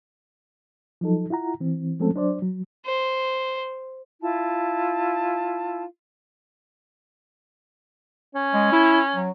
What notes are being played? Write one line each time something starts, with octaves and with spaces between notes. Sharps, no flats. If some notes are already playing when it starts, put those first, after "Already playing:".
F3 F#3 D#4 A4
E4 F4 F#5 A#5
E3 C4
F3 G#3 A3 C4 C#4 A4
F#3 D4 C5 D5
F#3
C5
E4 F4 A5
C#4
G#3
E4
F#3